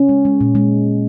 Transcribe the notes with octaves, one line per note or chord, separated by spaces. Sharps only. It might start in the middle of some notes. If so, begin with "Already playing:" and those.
Already playing: C#4
G#3
G#3
A#2
G#3